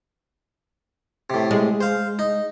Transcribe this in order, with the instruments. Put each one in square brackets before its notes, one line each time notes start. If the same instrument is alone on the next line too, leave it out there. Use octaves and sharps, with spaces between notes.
[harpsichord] A2 C3
[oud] G#3
[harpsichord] C5 F5
D#4